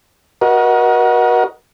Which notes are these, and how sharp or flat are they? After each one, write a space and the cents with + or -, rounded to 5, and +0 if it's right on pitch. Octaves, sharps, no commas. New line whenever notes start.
F#4 +0 A#4 +40 D#5 +10